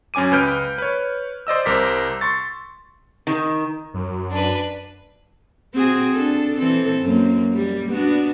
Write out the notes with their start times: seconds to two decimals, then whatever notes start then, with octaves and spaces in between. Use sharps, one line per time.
0.14 F#2 C#4 G#5 D6 D#7
0.32 C#2 B4 F6 G6 D7
0.78 B4 C#5
1.47 C5 D5 D#5 E6
1.66 C2 A#4 C5 D6 B6
2.21 C6 C#6 A6
3.27 D#3
3.94 F#2
4.30 D4 B4
5.74 C4 F#4 G#4
6.12 D4 A4
6.58 E3 C4 A4
7.02 F#2 A#3
7.54 G3 A#3
7.88 B3 D4 F#4